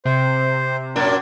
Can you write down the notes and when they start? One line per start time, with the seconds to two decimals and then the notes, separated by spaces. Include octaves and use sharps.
0.05 C3 C5
0.96 F#2 A#2 D4 A#4